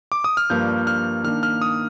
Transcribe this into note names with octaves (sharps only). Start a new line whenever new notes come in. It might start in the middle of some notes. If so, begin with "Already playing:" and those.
D6
D#6
F6
G2 F3 A#3 D4 G6
F6
D#3 A#3 D4 F6
F6
D#6